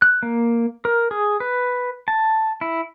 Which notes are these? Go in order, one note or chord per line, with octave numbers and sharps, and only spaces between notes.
F#6
A#3
A#4
G#4
B4
A5
E4